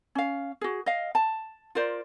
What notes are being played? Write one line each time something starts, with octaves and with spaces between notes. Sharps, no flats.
C#4 F5
F#4 G#4
D#5 F5
A5
F4 A#4 C5 D5